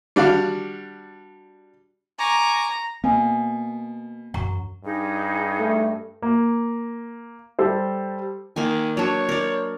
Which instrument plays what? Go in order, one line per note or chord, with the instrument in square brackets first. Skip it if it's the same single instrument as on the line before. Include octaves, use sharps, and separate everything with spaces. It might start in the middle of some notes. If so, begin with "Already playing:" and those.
[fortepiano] G3 D4 F#4 F5
[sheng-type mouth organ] G#5 C#6 D6 [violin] A#5
[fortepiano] B2 [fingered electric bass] A#3 B3 [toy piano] F5 G#5
[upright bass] F#2 E3 [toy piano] F#5 A#5 C#6
[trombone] G2 [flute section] D#4 G#4
[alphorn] A3
[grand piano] A#3
G3 A4 C5
[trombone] D#3 [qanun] A#3 G#5
[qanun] F#3 D4 [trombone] C#5
[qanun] A#4 D5